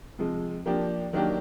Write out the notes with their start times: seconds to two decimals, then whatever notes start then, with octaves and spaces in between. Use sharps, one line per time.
0.19 C3 F3 G#3
0.66 F3 A#3 D4 G4
1.13 D#3 F#3 A#3 D4 G4